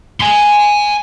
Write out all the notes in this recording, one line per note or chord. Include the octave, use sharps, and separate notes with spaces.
G#5 C6